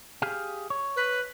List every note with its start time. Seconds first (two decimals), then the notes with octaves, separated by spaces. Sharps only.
0.22 G4 G#4 F5
0.70 C#5
0.96 B4